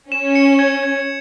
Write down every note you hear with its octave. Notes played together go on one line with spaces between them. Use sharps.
C#4 E7
C#7
G#6
G#6